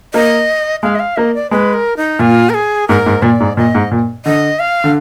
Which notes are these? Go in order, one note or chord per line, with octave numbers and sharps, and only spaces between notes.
A#3 D#5
G#3 F5
D#5
F5
A#3 D#5
D5
G#3 B4
A#4
D#4
A#2 F4
A#4
G#4
G#2 A#4
G#2
A#2 D5
G#2
A#2 D#5
G#2
A#2
D3 D#5
F5
D3